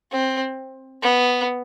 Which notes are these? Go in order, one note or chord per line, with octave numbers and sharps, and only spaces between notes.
C4
B3